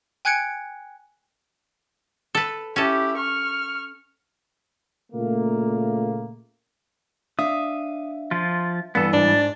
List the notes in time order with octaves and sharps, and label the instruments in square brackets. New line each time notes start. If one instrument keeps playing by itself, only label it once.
[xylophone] G5 G#5 F#6 G#6 C#7 D7
[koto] A4 B4
[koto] C#4 A4 [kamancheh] E4 G4
[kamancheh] C#6 F6
[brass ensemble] A#2 C#3 A3 A#3
[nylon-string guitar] D4 [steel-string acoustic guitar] E5 F5 [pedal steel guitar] D#6
[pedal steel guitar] F3 F4
[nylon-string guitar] G2 E3 [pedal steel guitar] B3 A4
[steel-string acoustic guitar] G#2 [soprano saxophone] D4 [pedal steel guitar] D5